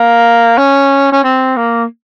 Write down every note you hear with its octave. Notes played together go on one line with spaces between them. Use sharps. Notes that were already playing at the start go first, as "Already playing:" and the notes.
Already playing: A#3
C#4
C#4
C4
A#3